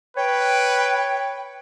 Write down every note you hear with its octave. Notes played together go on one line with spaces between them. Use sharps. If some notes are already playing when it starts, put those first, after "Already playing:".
B4 C#5 G5